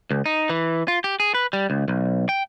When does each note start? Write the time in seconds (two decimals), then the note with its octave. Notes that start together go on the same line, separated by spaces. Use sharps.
0.11 C#2
0.26 D#4
0.50 E3
0.88 F4
1.04 G4
1.20 G#4
1.34 B4
1.53 G3
1.70 C#2
1.88 B1
2.29 G5